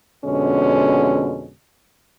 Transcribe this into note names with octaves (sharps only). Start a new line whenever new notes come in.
F2 B2 D3 G#3 C#4